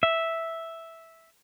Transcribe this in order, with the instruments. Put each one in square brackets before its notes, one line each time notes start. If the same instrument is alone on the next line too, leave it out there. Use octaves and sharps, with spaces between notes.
[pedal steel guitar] E5